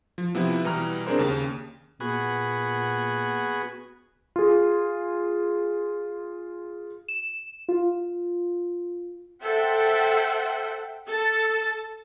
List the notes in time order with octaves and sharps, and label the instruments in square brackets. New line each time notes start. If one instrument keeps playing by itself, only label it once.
[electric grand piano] F3
C3 F3 B3 E4
B2 E3 G3 A#5 F6
C4 D4 G#4 A#4 C5
D#2 C#3
[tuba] A#2 [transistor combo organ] B3 F#4 G#4
[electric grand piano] F4 G#4
[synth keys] E7
F4
[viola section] A4 C5 E5 F#5 G5
A4 A5